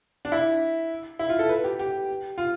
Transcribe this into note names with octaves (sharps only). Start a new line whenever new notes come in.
D4
E4
E4
F4
A4
B4
G4
G4
F4